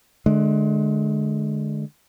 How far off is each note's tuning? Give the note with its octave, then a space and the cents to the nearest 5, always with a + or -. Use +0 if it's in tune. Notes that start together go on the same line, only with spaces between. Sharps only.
D3 +25 G#3 +35